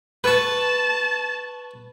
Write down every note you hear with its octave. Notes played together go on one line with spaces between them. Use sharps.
B4 A5 C#6